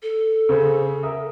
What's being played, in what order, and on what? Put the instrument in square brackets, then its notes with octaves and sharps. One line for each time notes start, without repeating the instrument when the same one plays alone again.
[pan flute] A4
[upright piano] C#3 G#4 C5
A#4 E5 D#6